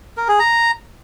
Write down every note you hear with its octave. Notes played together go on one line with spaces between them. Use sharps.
A#4
G#4
A#5